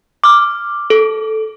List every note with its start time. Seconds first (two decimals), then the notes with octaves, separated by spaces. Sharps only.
0.24 D6 F6
0.90 A4